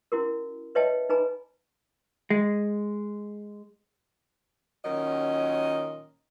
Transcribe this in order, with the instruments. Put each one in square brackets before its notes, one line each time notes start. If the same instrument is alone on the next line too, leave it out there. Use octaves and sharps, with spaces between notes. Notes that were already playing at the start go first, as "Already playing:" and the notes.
[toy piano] C#4 E4 F#4 A#4
B4 C#5 D#5 E5 G5 A5
D#4 B4 G#5 A#5 B5
[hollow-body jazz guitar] G#3
[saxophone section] A#2 D#3 F#3 C#4 D#5